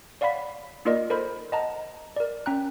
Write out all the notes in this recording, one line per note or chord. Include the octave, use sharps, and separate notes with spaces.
C#5 D5 F5 F#5 B5 B6
A#3 D#4 F4 A#4 D5 D#5
A4 A#4 C5 B5
D#5 F#5 A5 A#5
A#4 D5
C#4 G5 A#5 F#6